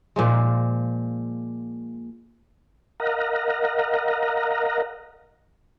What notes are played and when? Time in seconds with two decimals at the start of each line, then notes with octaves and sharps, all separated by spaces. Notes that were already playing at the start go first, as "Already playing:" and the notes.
0.16 A#2 F3 G#3
3.00 A#4 D#5 F5 F#5 A#5